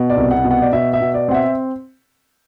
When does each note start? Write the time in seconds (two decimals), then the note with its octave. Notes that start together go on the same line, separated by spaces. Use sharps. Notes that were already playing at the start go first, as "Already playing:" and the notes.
Already playing: B2
0.10 D5
0.17 C2
0.31 F#5
0.44 B2
0.51 F#5
0.62 D5
0.73 B2 E5
0.93 E5
1.01 B2
1.14 D5
1.28 C4 F#5
1.34 E5